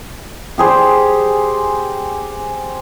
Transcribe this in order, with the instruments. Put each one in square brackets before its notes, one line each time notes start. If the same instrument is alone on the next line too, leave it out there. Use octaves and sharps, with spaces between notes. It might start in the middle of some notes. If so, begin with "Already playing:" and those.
[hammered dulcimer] G4 G#4 C5